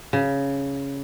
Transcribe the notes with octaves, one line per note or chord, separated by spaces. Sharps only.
C#3